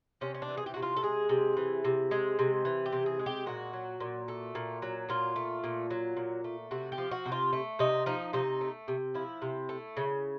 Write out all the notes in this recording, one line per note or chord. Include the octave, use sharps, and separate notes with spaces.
C3 C#4
C#4
D4
E3
G#4
G4
C3 F#4
F4
A4
G#3 G#4
C3
E3
C3
G#3
C3
E3
G4
C3
G#4
G#3
G4
A#2 F#4
F#3
A#2
A3
A#2
F#3
A#2 F4
A3
A#2
F#3
A#2
A3
C3 F#4
G4
F3
F#4
C3
F4
A3
C3 D#4
F3 D#4
C3 D#4
A3
C3
F3 E4
C3
A3
C#3